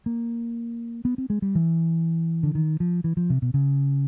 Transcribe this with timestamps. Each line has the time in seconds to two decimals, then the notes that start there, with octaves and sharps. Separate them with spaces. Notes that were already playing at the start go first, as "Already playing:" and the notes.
0.06 A#3
1.05 B3
1.18 C4
1.30 G#3
1.42 G3
1.55 E3
2.43 D3
2.55 D#3
2.80 F3
3.04 E3
3.17 F3
3.30 C3
3.42 B2
3.54 C#3